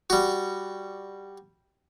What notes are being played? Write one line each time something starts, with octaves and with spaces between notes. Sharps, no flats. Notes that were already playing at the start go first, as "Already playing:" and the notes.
G3 F#4